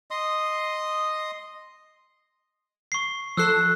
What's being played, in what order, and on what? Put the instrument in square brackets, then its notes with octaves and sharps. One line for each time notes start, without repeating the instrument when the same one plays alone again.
[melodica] D#5 C6 D#6
[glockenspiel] C#6 C7
[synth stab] F3 A4 [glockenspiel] E6 F#6 C7